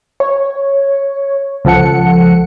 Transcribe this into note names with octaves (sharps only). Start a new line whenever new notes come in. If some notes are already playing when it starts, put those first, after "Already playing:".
C#5
C#2 F3 A4 F#5 C#7